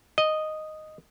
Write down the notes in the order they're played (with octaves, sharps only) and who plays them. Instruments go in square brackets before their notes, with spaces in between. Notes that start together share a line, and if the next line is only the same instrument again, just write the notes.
[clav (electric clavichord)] D#5